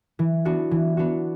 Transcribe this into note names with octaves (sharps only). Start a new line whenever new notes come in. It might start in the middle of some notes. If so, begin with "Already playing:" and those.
E3
B3 D4 F#4
E3
B3 D4 F#4